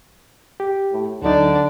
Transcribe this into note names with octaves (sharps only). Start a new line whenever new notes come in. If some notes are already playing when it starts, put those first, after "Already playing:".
G4
A2
D2 D3 F#3 D4 D#4 D5